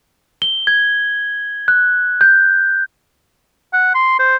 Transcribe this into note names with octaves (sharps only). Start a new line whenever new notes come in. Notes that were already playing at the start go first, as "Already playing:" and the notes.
G7
G#6
F#6
G6
F#5
C6
C5